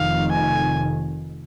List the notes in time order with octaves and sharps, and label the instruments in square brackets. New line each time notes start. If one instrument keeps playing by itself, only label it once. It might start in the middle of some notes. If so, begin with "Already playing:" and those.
Already playing: [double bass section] F1 F2 D#3 [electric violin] F5
[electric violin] G#5